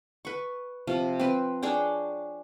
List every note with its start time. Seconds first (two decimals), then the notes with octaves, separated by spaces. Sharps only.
0.25 B4 C#6
0.87 C3 F3
1.19 C4 B4
1.62 D4 G#4 C#5 G5